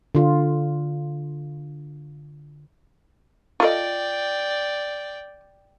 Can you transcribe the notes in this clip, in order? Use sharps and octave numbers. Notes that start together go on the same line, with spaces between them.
D3 F4
F4 A4 D5 D#5 G5